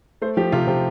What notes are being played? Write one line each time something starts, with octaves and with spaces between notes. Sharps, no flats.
A3 C5
F3 G4
C3 F4
C3 G4